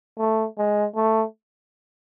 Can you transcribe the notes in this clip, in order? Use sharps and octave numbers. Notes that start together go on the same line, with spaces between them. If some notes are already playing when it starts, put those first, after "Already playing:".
A3
G#3
A3